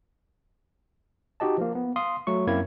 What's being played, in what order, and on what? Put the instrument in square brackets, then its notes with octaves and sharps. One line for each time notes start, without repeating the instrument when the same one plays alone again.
[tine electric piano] D#4 F#4 G4 D#5 A5
F3 A#3
B3
F5 C6 D#6
F#3 A3 C#6
F#2 A#3 C4 E4 G#6